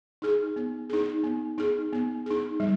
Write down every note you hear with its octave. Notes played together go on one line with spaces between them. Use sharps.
D#4 G#4
B3
D#4 G#4
B3
D#4 G#4
B3
D#4 G#4
G3